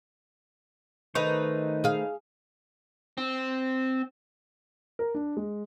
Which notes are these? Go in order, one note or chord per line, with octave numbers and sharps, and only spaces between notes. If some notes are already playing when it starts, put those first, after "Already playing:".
D#3 A3 D#4 A4 B4 C5 C#6
G#4 F5
C4
A#4
D4
G#3